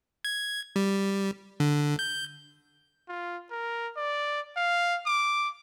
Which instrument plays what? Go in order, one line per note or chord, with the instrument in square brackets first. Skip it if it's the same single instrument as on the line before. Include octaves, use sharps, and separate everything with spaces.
[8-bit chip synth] G#6
G3
D3
G6
[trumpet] F4
A#4
D5
F5
D6